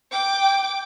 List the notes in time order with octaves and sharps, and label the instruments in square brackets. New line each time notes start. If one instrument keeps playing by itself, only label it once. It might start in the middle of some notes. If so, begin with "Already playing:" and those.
[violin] G5 D6